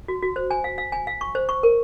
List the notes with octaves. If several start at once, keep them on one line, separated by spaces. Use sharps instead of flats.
F#4
F#4
C5
G#5
F5
F5
G#5
F5
C#6
C5
C#6
A#4